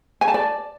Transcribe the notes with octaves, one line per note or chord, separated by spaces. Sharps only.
G#5
A5
D5